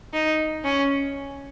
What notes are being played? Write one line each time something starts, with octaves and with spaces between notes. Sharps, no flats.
D#4
C#4